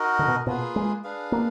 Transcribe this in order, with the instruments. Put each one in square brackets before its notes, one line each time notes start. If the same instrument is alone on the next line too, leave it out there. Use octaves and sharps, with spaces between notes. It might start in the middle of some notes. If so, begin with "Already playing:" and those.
Already playing: [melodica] D#4 F#4 A#4 D#5
[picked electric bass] D3
B2
[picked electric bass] B2 [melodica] A#3 F4 G#4 B4
[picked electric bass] G#3
[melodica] D4 G#4 B4 F5
[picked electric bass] A#3